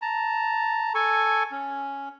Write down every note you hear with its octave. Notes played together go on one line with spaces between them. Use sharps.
A5 A#5
A4 G#5 C#6
C#4